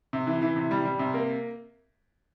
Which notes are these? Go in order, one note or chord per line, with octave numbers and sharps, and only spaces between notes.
C3
E3
E3
C3
G3
G3
C3
A#3